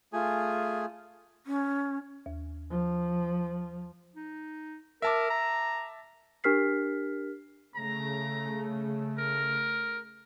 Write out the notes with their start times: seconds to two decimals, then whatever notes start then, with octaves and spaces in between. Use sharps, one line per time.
0.13 A3 F4 G#4 G#5
1.46 C#4
2.26 D#2
2.71 F3
4.16 D#4
5.02 A#4 E5 A5 D6
5.30 A#5
6.44 D4 G4 A#4 F6 B6 C7
7.76 C#3 A3 A#5
9.19 A#4